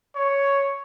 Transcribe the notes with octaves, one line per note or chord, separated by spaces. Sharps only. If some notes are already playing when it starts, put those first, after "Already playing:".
C#5